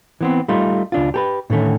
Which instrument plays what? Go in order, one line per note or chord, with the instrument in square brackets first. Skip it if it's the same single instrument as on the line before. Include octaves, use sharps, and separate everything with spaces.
[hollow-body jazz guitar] E3 B3 C4
G3 A3 D#4 F4
C#2 D4 F4
G4 A4 B4
A2 D3 D#3 A3 C#4